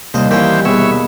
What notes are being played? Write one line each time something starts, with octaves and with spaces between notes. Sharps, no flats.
D#2 C3 G3 D#5
E3 A#3 C4 C#4 G4
C2 B2 G#4 B4 C#5 E5